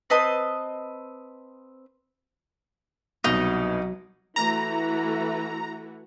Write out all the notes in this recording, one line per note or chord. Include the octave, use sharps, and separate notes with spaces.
C4 B4 D#5 A5
C2 B2 F#3 B3 D#4 F#4
E3 A3 F#4 A#5